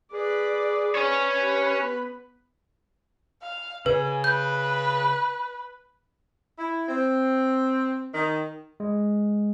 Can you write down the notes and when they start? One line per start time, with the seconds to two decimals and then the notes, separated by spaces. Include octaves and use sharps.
0.13 G#4 B4 D5
0.96 C#4 B4 C#5
1.39 G4
1.82 B3
3.42 F5
3.86 C#3 B4 G#5
4.24 B4 G6
6.59 E4
6.89 C4
8.14 D#3
8.80 G#3